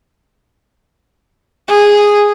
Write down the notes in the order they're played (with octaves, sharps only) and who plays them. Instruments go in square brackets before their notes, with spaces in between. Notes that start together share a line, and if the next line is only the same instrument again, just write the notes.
[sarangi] G#4